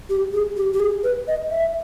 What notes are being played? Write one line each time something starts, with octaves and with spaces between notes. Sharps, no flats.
G4
G#4
G4
G4
G#4
B4
D#5
E5